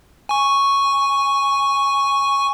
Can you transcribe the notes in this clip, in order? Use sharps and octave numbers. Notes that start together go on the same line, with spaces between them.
G#5 C#6